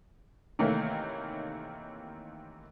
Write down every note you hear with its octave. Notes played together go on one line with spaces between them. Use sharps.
C3 D#3 E3 A3 A#3 C#4